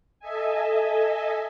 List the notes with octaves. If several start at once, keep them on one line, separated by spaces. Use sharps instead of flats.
A4 D#5 E5 G#5